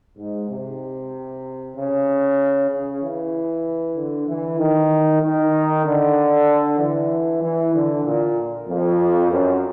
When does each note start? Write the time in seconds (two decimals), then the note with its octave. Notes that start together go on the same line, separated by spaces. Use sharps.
0.17 G#2
0.49 C3
1.75 C#3
2.69 C#3
3.02 E3
3.95 D3
4.27 E3
4.59 D#3
5.22 D#3
5.84 D3
6.79 E3
7.42 E3
7.74 D3
8.04 A#2
8.68 F2
9.31 F#2